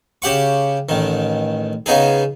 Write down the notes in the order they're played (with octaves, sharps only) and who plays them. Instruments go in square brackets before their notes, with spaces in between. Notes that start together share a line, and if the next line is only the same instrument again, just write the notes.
[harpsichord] C#3 G4 F#5 C#6
A1 D#3
C#3 B3 D#4 G#4